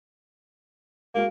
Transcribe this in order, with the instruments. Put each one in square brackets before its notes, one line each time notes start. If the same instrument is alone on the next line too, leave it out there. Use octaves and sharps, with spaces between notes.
[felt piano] G#3 F#4 F5 [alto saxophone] A#3